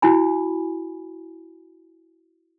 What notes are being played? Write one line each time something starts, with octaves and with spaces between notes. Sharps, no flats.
E4 F#4 G#5 B5